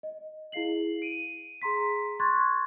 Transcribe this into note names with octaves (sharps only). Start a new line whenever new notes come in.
D#5
E4 G#4 F5 C7 F#7
D7 D#7
G#4 A#5 C6 B6
C6 C#6 F#6 G#6 A6